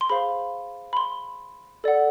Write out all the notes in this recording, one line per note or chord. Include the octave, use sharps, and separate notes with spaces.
C6
G#4 C5 F5 B5
B5
C6
A4 D5 F#5